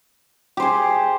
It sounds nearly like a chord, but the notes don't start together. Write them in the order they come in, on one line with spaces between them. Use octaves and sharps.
G4 C5 G#4